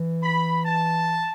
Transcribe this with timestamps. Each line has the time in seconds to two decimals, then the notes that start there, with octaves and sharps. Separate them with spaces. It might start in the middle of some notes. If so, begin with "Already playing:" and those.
Already playing: E3
0.23 B5
0.64 A5